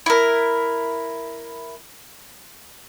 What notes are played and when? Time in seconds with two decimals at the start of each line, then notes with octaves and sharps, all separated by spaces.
0.06 E4 A#4